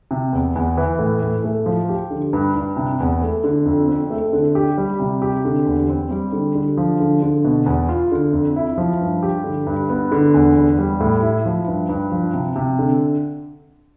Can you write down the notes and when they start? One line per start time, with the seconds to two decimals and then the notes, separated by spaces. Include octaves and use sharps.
0.11 C3
0.33 E2
0.56 E2
0.77 E3
0.99 A2
1.22 A2
1.44 A3
1.66 F3
1.89 G4
2.11 D3
2.33 G2
2.55 G2
2.77 C3
3.00 E2
3.22 A3
3.44 D3
3.66 F2
3.88 C4
4.10 A3
4.33 D3
4.55 G4
4.78 G3
5.00 C3
5.22 G4
5.45 D3
5.66 E2
5.89 C4
6.11 G3
6.33 D3
6.55 D3
6.77 F3
7.00 D3
7.23 D3
7.44 B2
7.66 E2
7.89 F4
8.12 D3
8.33 F2
8.56 E4
8.78 F3
9.01 G2
9.23 G4
9.44 D3
9.67 G2
9.90 B3
10.12 D3
10.34 E2
10.55 E2
10.79 G3
11.01 A2
11.23 E4
11.45 F3
11.68 G2
11.89 G2
12.12 F3
12.34 C3
12.56 C3
12.79 D3